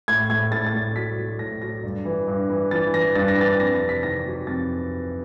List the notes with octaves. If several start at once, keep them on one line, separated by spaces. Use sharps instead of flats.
A2 G#6
A2 G#6
A2 A6
A6
A2
F#3 B6
F#3
A2 A#6
F#3 A#6
G2
E3
G2
E3
E3 A6
E3 A#6
G2 A6
A#6
E3 A6
F2 A#6
A#6
C3
B6
D#3 A#6
F#3
F2 A6